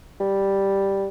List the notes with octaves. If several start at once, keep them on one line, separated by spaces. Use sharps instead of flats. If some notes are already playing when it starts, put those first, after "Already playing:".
G3